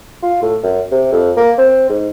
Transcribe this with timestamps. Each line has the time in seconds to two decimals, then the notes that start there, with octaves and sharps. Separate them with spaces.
0.23 F4
0.42 A2
0.63 F#2
0.92 C3
1.12 F2
1.37 A#3
1.58 C4
1.89 G#2